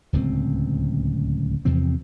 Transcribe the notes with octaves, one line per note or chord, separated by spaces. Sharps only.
D1 C#2 C4
E2 C3 F3 C4